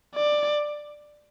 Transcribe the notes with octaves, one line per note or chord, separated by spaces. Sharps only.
D5